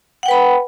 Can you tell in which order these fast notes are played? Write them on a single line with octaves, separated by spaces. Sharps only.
F#5 G5 B4 B5